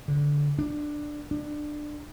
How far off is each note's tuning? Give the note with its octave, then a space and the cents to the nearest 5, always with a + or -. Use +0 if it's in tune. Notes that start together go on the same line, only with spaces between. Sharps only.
D3 -15
D4 +10
D4 +20